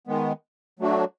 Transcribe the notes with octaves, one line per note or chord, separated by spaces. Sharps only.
D#3 G#3 B3
F#3 A3 D4 F#4